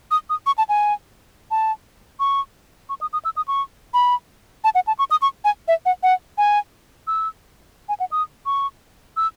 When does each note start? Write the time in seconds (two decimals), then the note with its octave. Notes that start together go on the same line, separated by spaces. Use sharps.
0.11 D#6
0.30 D#6
0.46 C#6
0.58 A5
0.69 G#5
1.51 A5
2.20 C#6
2.89 C#6
3.01 D#6
3.13 D#6
3.25 E6
3.37 D#6
3.48 C#6
3.94 B5
4.64 A5
4.75 F#5
4.87 A5
4.99 C#6
5.11 D#6
5.22 C#6
5.45 G#5
5.68 E5
5.86 F#5
6.03 F#5
6.38 G#5
7.07 E6
7.89 G#5
8.00 F#5
8.12 D#6
8.46 C#6
9.17 E6